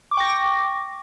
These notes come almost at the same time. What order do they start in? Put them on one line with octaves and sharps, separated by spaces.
D6 C#6 G5 A#6